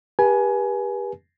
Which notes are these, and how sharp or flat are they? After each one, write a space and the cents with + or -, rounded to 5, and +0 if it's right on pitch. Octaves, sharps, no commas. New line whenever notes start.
G4 +20 B4 -35 G#5 +20